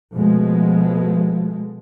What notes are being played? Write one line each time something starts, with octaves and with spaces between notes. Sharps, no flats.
B2 F3 G#3 A3